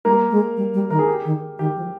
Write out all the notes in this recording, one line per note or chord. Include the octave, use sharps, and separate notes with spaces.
G3 A#3 A#4
G#3
G3
G3
D#3 A#4
G#4
G4
D#3
D#3 G4
F3